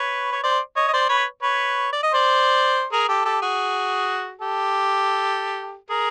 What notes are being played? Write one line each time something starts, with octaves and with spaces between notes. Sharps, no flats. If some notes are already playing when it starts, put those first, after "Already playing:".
Already playing: B4 C#5
C#5
C5 D5
C#5 D#5
D#5
C5 D5
B4 C#5
B4 C#5
D5
D#5
C5 D5
G#4 A#4
G4 A4
G4 A4
F#4 G#4
G4 A4
G#4 A#4